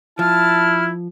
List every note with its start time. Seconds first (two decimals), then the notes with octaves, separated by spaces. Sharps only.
0.19 F3 E4 A5 F6